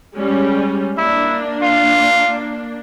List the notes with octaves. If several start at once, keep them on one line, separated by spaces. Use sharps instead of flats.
G3 G#3 C#4
A#3 D4 E4
F4